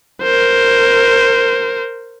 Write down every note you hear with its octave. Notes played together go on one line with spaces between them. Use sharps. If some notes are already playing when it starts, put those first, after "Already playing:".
A#4 C5